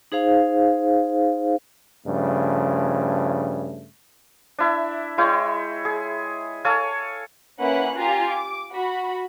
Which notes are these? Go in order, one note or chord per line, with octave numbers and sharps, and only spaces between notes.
D#4 G#4 C5 F5
G2 C#3 F3 A3
D4 E4 E5
G#3 E4 C#5 G5
G#4
A4 C#5 F5 G#5
A#3 C#4 E4 B4 F#5 F#6
F4 G4 G#5 A#5
D6
F#4 B5